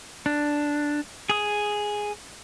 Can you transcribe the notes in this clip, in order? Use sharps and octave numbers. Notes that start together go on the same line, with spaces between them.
D4
G#4 D#6